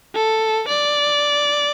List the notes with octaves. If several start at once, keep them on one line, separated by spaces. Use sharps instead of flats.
A4
D5